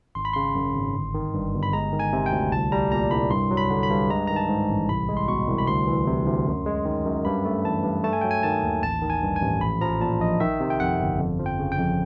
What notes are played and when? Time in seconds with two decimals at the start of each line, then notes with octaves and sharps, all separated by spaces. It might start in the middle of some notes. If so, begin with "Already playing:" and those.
0.15 G#1 C6
0.25 B5
0.33 C#3 C6
0.55 F#2
0.75 G#1
0.95 G1
1.14 D#3
1.34 G2
1.53 G1
1.63 B5
1.73 G#3 A#5
1.93 D#3
2.00 G#5
2.13 C3
2.26 G5
2.32 D2
2.52 C2 A5
2.72 G3 A#5
2.92 A#2 A#5
3.11 C2 B5
3.31 G2 C6
3.51 F#3
3.57 B5
3.70 D3
3.83 B5
3.90 G2
4.10 G#3 A#5
4.27 D#3 A#5
4.36 A5
4.49 G#2
4.69 A1
4.89 C2 B5
5.09 G#3
5.17 C6
5.28 B2 C#6
5.48 C2
5.58 B5
5.67 D2 C6
5.87 E3
6.07 C3
6.26 D2
6.47 F#2
6.66 G#3
6.85 D#3
7.06 F#2
7.25 G2 B5
7.45 A3
7.65 E3 A5
7.84 G2
8.04 A3 A5
8.13 G#5
8.21 F#3 G5
8.31 G#5
8.43 D#3 A5
8.63 D#2
8.83 A1 A5
9.02 D#3
9.10 G#5
9.23 G2
9.36 G#5
9.42 A1
9.61 A#1 B5
9.81 F3 A#5
10.01 A#2 A5
10.20 A#1 D#5
10.40 D#3 E5
10.60 C3
10.70 G5
10.80 F2 F#5
11.00 G1
11.19 F2
11.39 F3
11.46 G5
11.59 C#3
11.72 G5
11.79 F2